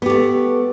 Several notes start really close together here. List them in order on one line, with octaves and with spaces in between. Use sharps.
B3 G4 A3